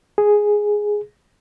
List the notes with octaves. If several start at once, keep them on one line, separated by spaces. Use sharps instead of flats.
G#4